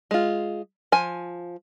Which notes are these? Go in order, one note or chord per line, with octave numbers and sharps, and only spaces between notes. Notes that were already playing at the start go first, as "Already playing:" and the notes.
G#3 F4
F3 G#5